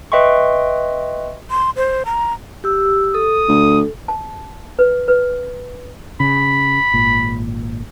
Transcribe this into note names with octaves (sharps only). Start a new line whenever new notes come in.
B4 D#5 E5 G5 C6 C#6
C6
C5
A#5
G4 E6
A4 D#6
D2
A5
B4
B4
C#3 B5
G#1 A#2